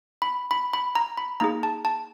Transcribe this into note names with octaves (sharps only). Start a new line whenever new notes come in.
B5
B5
B5
A#5
B5
A#3 D#4 G#4 A#5
A5
A5